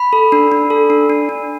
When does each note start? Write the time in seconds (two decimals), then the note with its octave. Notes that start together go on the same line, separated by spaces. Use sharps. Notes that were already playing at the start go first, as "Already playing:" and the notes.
Already playing: B5
0.13 A4
0.32 D4
0.52 D4
0.70 A4
0.90 D4
1.10 D4
1.29 D4